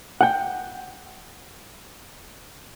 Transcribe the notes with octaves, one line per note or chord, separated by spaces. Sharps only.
F#5 G5